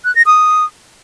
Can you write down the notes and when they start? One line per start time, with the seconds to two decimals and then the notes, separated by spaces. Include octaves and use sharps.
0.04 F#6
0.15 A#6
0.26 D#6